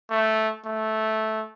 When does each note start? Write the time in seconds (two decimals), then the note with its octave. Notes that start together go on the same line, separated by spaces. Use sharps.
0.11 A3
0.65 A3